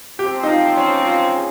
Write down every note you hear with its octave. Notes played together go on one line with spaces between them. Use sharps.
C3 F3 G#3 C4 G4
D#4
F4
C#4
F4
G#4